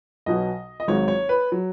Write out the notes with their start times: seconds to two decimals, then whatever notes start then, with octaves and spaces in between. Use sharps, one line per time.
0.26 B1 B2 F#3 D#5
0.80 D#5
0.88 G#1 G#2 F#3 C#5
1.08 C#5
1.29 B4
1.52 F#3